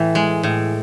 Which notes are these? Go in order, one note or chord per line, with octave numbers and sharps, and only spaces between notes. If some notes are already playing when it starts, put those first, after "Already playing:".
Already playing: A2 E3
G#3
A2